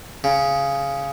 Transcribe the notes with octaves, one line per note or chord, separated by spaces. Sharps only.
C#3